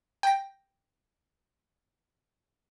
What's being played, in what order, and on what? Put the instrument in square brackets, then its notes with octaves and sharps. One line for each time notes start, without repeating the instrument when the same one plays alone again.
[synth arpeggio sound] G5 A#6